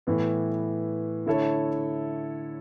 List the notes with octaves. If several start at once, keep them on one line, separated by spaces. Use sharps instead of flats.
A2 E3 B3
D3 A3 E4 A4 C#5